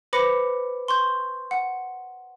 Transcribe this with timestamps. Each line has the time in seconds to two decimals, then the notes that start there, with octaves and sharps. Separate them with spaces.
0.13 B4 C5 B5 D6 A#6 C#7
0.88 C6 C#6 G6
1.51 F#5